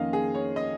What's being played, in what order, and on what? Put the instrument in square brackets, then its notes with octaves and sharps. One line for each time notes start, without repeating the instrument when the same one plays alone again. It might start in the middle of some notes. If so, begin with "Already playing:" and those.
Already playing: [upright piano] F2 D#3 A#3 C#4 D#5 F5
G#4
C#5
D#5